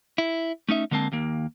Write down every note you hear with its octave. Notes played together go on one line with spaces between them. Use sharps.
E4
A3 C#4 D#4 E5
D3 G#3 A#3 C4 A5
D#2 A#3